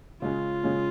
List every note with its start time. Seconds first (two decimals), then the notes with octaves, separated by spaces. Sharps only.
0.21 C#3 G#3 C#4 F4
0.63 C#3 G#3 C#4